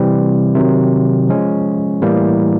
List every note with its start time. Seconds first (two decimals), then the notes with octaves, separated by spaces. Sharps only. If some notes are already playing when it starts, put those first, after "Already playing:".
Already playing: C3 E3 G3 C4
0.55 C3 D#3 F#3
1.29 F3 G#3 C#4
2.02 A2 E3 G3 A#3